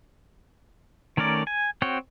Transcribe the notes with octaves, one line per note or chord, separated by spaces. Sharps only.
D#3 A3 C#4 A#4 D5
G#5
C4 F#4 C#5 G5